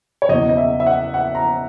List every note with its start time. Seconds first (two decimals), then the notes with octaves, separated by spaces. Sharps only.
0.22 C#5
0.29 F#1 E2 B2 D#5
0.49 D#5
0.57 E5
0.80 E5
0.87 F#5
1.14 F#5
1.35 A#5